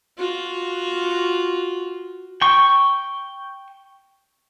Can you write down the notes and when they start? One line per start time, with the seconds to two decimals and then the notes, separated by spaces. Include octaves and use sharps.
0.17 F4 F#4
2.42 G5 C#6